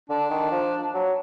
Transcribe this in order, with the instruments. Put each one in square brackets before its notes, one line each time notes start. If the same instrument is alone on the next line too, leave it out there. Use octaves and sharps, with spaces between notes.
[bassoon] D3 [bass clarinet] D4
[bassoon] D#3
F3
F#3